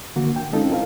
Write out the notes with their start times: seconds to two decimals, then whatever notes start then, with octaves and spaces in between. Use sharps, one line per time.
0.16 D3 A#3 F#4
0.36 G5
0.52 G#3 C4 C#4 D#4 F4 A4
0.70 E4 A#4 F5